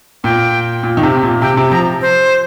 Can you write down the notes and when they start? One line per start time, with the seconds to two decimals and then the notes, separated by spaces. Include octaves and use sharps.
0.24 A#2 G5
0.83 A#2
0.97 D#3
1.03 C3
1.23 A#2
1.41 C3 G5
1.57 C3
1.71 F3 A#5
2.01 C5